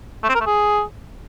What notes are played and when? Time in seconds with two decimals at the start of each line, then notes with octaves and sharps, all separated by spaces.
0.23 A3
0.29 C4
0.35 A#4
0.40 A3
0.46 G#4